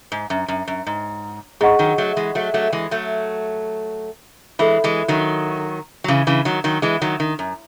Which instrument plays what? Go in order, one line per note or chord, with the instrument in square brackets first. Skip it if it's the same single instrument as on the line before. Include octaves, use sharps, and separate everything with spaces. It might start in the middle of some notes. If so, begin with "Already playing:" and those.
[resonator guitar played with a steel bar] G#2
F#2
F#2
F#2
G#2
[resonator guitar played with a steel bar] G#2 [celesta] G#4 D#5 F#5 C#6
[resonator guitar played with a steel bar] D#3 F#3
F#3 A3
E3 G#3
F#3 A3
F#3 A3
E3 G#3
F#3 A3
[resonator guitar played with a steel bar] E3 G#3 [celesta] A4 E5 B5
[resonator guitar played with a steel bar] E3 G#3
D#3 F#3
F#3
C#3 E3
C#3 E3
D#3 F#3
D#3 F#3
E3 G#3
D#3 F#3
D#3
F#2